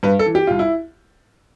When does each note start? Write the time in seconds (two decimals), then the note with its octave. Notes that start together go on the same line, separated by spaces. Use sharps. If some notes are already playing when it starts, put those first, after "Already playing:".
0.03 G2 B4
0.19 A4
0.26 E3
0.35 G4
0.47 C2 F4
0.59 E4